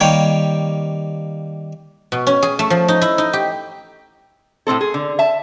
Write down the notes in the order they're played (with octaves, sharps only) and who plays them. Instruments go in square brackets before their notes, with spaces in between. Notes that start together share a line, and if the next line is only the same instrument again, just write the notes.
[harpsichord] D#3 G3 A#3 G4 C#5
[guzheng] B2
C#4
G#4
A3
F3
D#4
E4
D#4
G4
[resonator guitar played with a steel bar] A2 E3 C4 A4
G#4
D3
E5 A5